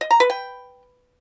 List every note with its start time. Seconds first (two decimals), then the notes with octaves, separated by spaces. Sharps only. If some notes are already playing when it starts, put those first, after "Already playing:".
0.01 D#5
0.11 A#5
0.20 B4
0.30 G5